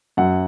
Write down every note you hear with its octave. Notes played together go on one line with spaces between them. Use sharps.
F#2 F#5